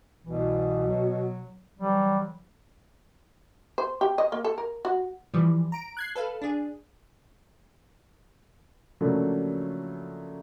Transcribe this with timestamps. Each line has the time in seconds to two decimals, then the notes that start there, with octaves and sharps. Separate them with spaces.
0.24 C2 B2 E3
0.87 F#3
1.79 D3 E3 F#3 G3
3.78 C5
4.01 G4
4.18 D#5
4.32 A#3
4.44 A4
4.58 A#4
4.85 F#4
5.34 E3 F3 G3
5.72 A#5 D7
5.97 F#6 G#6 C7
6.15 A4 B4 F5
6.42 D4 G#4
9.01 C#3 F3 F#3 A3 A#3 D4